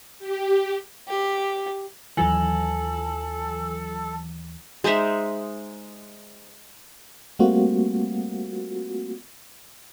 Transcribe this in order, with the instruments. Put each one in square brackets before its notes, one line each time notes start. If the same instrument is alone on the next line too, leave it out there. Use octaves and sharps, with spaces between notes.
[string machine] G4
[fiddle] G4
[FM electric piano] D#2 E3 [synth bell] F#3 F4 F#7 [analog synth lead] A4 [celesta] G#5
[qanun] G#3 D#4 C5 E5
[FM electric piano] G3 A3 A#3 C4 F4 F#4